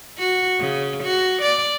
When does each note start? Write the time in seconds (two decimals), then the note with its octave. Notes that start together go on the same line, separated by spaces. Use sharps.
0.18 F#4
0.59 C#3
1.03 F#4
1.42 D5